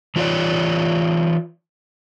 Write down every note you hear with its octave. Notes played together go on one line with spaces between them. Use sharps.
E3 F4 B4 C#5 D5